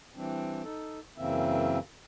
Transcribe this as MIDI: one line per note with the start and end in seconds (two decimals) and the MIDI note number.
0.15 0.63 52
0.15 0.63 55
0.15 0.63 60
0.15 0.63 62
0.64 0.99 63
0.64 0.99 69
1.18 1.78 42
1.18 1.78 49
1.18 1.78 52
1.18 1.78 58
1.18 1.78 60
1.18 1.78 76